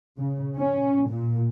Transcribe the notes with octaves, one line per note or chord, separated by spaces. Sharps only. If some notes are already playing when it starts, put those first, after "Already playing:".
C#3
C#4
A#2